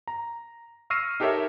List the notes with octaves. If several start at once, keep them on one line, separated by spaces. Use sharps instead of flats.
A#5
C#6 E6 F6 A#6 C7 D#7
D#4 G4 A4 A#4 C#5 E5